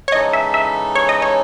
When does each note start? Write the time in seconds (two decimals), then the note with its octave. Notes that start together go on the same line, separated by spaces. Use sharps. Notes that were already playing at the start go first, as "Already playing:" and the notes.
0.08 C#5
0.12 C#3 E3 G#3 D#4 A4 D#5
0.33 E5
0.54 E5
0.95 C#5
1.09 D#5
1.22 C#5